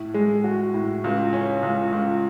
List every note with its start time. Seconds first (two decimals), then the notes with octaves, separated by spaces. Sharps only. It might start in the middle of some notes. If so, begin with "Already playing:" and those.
Already playing: A2
0.14 G#3
0.44 F#4
0.74 A2
1.04 C#2
1.33 C#4
1.63 C#2
1.92 C#2